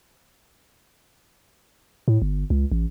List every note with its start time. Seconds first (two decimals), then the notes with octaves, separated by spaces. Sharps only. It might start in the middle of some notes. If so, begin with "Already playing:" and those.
2.08 A2
2.22 G1
2.50 C#2
2.72 A1